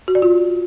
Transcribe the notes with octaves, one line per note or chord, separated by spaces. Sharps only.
F#4
D5
F4